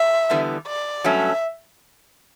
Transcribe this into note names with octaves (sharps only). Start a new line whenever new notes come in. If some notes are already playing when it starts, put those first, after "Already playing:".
Already playing: E5
E2 D3 G3 B3 E4
D5
G2 F#3 A3 C#4 E5